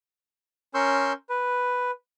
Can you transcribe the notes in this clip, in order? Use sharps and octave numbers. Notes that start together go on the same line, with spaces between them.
C#4 A#4 C6 C#6 E6 G6
B4